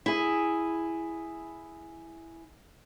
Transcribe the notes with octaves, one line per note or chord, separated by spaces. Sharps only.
E4 G#4